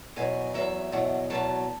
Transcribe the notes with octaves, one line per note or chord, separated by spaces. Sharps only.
E2 B2 F#3 G#5
E2 B2 F#3 E5
E2 B2 F#3
E2 B2 F#3 A5